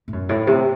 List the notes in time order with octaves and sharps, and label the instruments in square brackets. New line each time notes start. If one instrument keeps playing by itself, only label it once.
[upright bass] A2
F#2
A2
C3